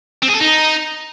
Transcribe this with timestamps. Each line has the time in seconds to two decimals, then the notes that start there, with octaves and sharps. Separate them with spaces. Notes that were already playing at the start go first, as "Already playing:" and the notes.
0.23 C4
0.29 G#4
0.35 A4
0.41 D#4